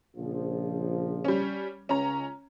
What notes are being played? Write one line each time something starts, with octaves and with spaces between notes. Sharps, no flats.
A#1 C#3 F3
G3 C#4
C#2 C#4 A#5